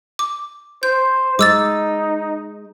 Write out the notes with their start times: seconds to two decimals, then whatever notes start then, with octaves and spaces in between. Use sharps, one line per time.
0.19 D6
0.83 C5 G6
1.39 G#3 D#4 D6 E6 A6